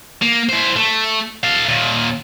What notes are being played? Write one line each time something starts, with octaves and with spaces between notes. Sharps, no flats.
A#3
E4 C5
A3
A4 F5
D#2 A#2